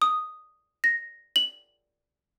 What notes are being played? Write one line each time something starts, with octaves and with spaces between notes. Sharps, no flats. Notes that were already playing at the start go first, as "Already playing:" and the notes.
D#6
A#6
F#7